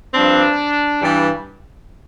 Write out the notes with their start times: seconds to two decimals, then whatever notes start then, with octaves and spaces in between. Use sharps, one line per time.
0.14 G2 F3 C4 D4
1.00 G2 E3 G3 D4